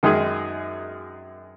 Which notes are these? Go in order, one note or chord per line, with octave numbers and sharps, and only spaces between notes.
F#2 D#3 G#3 D#4 G#4